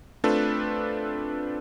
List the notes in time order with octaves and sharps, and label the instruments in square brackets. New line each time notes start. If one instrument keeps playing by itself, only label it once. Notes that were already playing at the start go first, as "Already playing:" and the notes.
[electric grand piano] A3 C4 D4 F4 A4 B4